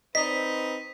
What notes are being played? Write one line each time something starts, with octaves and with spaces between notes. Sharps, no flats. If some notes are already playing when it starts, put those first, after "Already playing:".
C4 D#4 B4 D5 D#5 B6